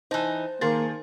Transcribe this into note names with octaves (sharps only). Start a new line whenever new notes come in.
E3 D#4 C5 A5
D#3 A#3 G#4 C6 A6